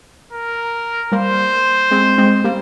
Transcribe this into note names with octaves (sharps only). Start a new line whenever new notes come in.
A#4
G3 A#3 C5
G#3 C4
G#3 C4
G3 A#3